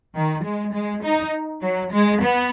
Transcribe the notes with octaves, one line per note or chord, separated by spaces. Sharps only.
D#3
G#3
G#3
D#4
F#3
G#3
B3